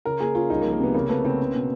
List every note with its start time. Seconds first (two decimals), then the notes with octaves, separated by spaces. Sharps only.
0.05 C#3 A#4
0.20 A#3 G#4
0.35 C#4 F4
0.50 C2 D#4
0.61 A#3
0.65 F3
0.72 A#3
0.79 C3 B3
0.94 C#3 A#3
1.09 A3 B3
1.25 C#3 C4
1.40 C#4
1.54 B2